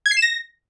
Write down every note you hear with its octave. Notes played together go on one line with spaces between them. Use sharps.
G#6
C7
E7
A#6